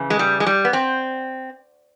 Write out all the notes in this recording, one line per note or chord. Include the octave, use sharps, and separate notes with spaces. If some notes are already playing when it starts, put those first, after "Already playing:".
Already playing: C#3 E3
G#3
G3
G#3
G3
B3
C4